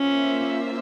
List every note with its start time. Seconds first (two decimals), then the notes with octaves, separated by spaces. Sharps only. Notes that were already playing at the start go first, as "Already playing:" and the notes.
Already playing: A#3 C#4 F4 C5 E5